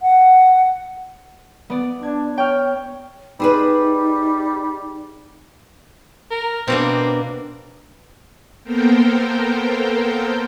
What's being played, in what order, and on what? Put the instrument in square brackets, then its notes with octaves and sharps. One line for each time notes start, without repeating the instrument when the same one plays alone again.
[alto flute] F#5
[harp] B3 D5
[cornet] D4 [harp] G#6
[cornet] C#5 [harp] G5 F6
[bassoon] G3 [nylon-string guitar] C4 G#4 B4 [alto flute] D#4
[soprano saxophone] A#4
[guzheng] B2 A#3 D4 [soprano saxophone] C4
[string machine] A#3 B3 A4 A#4 C5 G5